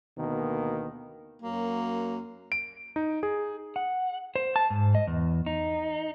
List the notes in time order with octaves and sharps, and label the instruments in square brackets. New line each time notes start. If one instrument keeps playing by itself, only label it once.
[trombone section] D2 B2 D#3 A#3
[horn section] F#2 F#3 A#3
[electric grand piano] D7
D#4
G#4
[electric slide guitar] F#5
C5
A5
G#2
D#5
E2
D#4